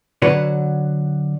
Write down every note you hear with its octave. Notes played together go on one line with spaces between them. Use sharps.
D3 F#3 F#4 B4 C#5